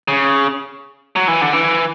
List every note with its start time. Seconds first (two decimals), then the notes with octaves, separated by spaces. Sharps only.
0.08 C#3
1.16 F#3
1.28 E3
1.41 D3
1.53 E3